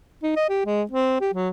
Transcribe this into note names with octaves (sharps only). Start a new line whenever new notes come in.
D#4
D#5
G4
G#3
C4
G4
F#3